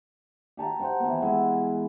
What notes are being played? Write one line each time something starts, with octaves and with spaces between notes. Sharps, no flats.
G4 A5 A#5
C5 F#5 G5
E3 B3
G#3 E4 E5